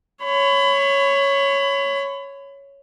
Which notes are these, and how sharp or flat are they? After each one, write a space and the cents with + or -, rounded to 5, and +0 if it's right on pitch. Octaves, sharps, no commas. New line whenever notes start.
C#5 +0 B5 +30